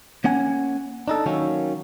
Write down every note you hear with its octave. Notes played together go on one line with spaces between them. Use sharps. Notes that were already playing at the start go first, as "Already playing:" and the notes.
A#3 C#4 F#5 G#5
D4 D#4 A4
D#3 F#3 A#3 C#4